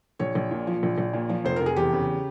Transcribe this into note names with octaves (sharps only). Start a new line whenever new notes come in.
A#1 C#5
A#1
A#2
F3
A#1
A#1
A#2
F3
F1 C5
F1 A#4
G#4
E2 G4
C#3